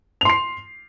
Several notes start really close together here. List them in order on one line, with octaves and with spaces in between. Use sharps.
F7 C6 C7